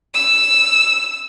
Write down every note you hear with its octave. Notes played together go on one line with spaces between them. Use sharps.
E6